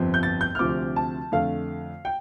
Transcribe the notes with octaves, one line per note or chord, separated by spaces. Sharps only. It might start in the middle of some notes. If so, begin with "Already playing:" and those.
Already playing: G1 F2 F3 C4
G6
A6
G6
F6
D2 C3 F3 C4 D6
A5
F2 D3 A3 F5
G5